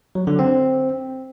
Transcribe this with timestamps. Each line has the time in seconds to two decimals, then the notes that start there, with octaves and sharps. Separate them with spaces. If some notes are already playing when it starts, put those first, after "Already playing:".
0.15 F#3
0.27 D3
0.39 C4